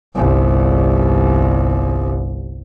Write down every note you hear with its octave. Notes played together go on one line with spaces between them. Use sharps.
G1 C2